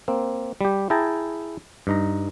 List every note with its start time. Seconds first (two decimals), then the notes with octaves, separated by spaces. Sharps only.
0.08 A#3 C4
0.61 G3 G4
0.90 E4 G#4 G5 A5 A#5
1.87 G2 D#4 A#5